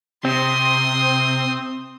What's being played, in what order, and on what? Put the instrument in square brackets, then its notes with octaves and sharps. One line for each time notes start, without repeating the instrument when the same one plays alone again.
[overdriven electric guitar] C3 [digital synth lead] C4 [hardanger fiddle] C6 D#6